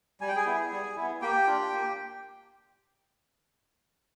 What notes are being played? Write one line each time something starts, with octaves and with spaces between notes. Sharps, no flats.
G3 G#5
G5
G#4 G#5
B3 E4
G3
B3 E4
A#3 G4 G5
D4 F4
A#3